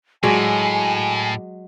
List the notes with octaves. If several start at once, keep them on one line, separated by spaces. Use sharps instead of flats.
A2 F#3 G#3 D5 G#5